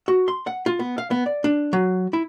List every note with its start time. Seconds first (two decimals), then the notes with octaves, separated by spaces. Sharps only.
0.08 F#4
0.28 C6
0.47 F#5
0.66 F4
0.79 B3
0.98 F5
1.11 B3
1.26 D5
1.44 D4
1.73 F#3
2.13 E4